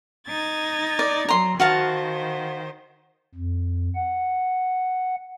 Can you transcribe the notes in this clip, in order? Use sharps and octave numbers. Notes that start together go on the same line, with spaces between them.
D#4 G#6 A6
D5
F#3 A#5 C6
D#3 F#4 C5 F5 A5
F2
F#5